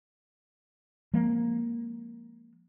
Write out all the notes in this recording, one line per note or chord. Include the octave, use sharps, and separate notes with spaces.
F3 G#3 A#3 C4